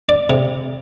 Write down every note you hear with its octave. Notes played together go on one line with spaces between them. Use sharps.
D5
C3